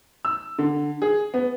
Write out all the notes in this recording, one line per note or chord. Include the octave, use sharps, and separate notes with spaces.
E6
D3
G#4
B3